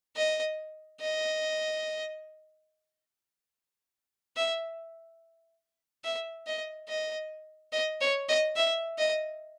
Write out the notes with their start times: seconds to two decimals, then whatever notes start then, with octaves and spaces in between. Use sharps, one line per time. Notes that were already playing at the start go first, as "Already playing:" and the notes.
0.16 D#5
1.01 D#5
4.36 E5
6.04 E5
6.47 D#5
6.89 D#5
7.72 D#5
8.01 C#5
8.29 D#5
8.56 E5
8.98 D#5